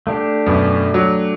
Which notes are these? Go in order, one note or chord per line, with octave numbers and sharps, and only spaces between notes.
A3 D4 G4
F#2 B2
F#3